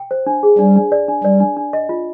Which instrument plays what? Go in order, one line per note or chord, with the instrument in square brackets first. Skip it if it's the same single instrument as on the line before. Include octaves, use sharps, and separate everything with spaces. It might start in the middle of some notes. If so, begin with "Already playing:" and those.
Already playing: [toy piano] G5
C5
D4
G#4
[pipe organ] G3 [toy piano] D4
[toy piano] D4
D5
D4
[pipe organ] G3 [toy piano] D5
[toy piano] D4
D4
D#5
F4